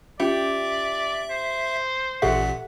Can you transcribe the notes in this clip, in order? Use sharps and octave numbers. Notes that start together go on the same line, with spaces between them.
C#4 F4 G4 D5 E5 G5
C5
A1 A#2 G4 A4 E5 F#5 B6